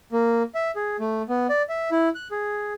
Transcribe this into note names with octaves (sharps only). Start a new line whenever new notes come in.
A#3
E5
G#4
A3
B3
D5
E5
E4
F#6
G#4